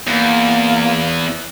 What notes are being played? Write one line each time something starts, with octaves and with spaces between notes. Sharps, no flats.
E2 A#3